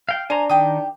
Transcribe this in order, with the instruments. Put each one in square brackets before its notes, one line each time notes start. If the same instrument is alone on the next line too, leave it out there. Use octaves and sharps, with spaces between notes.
[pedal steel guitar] F5 G5
[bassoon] D4 [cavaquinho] C5 [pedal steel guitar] G#5 A#5
[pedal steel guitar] D#3 [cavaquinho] G4 G5 D#6